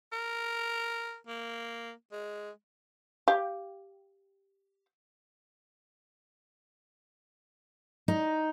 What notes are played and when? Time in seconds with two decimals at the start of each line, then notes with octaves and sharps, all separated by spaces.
0.12 A#4
1.27 A#3
2.12 G#3
3.28 G4 F5
8.08 D#4